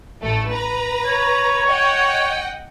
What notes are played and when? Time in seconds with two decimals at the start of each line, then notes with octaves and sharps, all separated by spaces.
0.21 A1 A3 A4
0.50 B4 A#5
1.06 C#5
1.66 D#5 F#5 G5